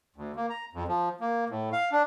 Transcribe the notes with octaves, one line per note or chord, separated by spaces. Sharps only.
D2
A#3
A#5
F2
F3
A#3
A2
F5
D4